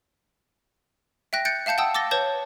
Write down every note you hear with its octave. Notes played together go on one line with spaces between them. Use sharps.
E5 G5 F#6 A#6
F#6 G6 A6 C#7 D7
E5 F5 A5 G6 C#7
F#5 G5 A5 D#6 E6
D6 E6 A6 A#6 G7
B4 C#5 A5 G6